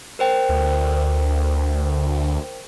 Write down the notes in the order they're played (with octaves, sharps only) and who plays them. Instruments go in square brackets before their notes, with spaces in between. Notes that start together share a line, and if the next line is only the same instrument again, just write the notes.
[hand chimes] A#4 C5 G5
[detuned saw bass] D2